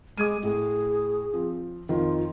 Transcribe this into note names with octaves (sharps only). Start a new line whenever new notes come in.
G#3 D6 G#6 D#7
A2 G#4
F3 C4
F2 D#3 F4